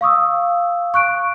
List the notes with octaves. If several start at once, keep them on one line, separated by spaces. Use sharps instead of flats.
F5 C#6 D#6 E6
C#6 F#6 D7